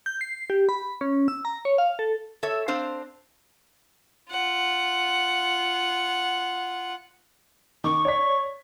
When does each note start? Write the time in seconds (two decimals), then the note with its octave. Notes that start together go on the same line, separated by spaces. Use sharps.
0.06 G6
0.21 C7
0.50 G4
0.69 B5
1.01 C#4
1.28 E6
1.45 A#5
1.65 C#5
1.78 F5
1.99 A4
2.43 A4 C#5 E5
2.68 C4 D4 C5 F5
4.31 F4 F#5
7.84 D#3 C#6 D6
8.05 C#5 D5 B6